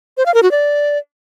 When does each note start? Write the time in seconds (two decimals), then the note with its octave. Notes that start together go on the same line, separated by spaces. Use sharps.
0.17 C5
0.26 F5
0.34 A#4
0.43 F#4
0.51 D5